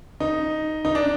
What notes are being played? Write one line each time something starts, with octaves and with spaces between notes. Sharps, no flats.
D#4
D#4
D4